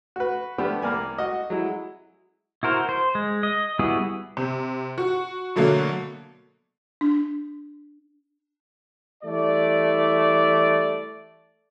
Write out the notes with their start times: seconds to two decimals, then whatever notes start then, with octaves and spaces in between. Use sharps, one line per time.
0.16 F#4 B4
0.58 F3 A3 B3 D4 G4
0.82 C2 A#3 A#4 D5 G#5
1.18 F#4 D#5
1.50 F#3 G#3 E4
2.63 E4 F#4 A#4 C5
2.89 C5
3.15 G#3
3.43 D#5
3.79 G3 B3 E4 F#4 G#4
4.37 C3
4.98 F#4
5.56 B2 D3 F#3 A3 A#3
7.01 D4
9.23 E3 G3 A3 D5